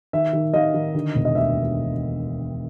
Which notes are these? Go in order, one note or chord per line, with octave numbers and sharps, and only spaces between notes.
D#3 E5
D#3
D#3 D#5 F5
D#3
D3
E1
D#5
D2 E5